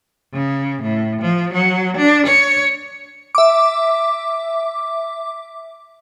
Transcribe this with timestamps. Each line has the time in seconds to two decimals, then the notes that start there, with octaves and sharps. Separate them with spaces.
0.34 C#3
0.82 A2
1.22 F3
1.53 F#3
1.97 D4
2.27 C#5
3.35 E5 D6